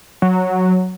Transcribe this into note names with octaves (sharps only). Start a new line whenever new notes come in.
F#3